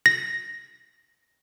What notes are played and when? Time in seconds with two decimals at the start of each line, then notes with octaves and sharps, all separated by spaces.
0.06 A#6